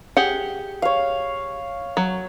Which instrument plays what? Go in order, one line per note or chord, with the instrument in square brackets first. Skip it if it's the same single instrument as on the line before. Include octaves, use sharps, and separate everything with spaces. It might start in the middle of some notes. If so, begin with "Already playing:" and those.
[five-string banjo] G4 G#4 F#5
[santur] C#5 F5
[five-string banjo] F#3